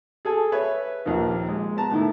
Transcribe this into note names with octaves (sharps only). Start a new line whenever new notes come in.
G#4 A4 G#5
B4 C#5 E5
A#1 D#2 D#3 F3 A#3
G#3
B3 A5 A#5
A2 D#3 E4